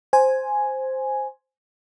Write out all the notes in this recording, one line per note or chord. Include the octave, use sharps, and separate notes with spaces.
C5 G#5